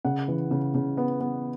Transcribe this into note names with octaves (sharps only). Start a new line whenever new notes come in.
C#3 F#5
E3
C#3
C#3
B3
B3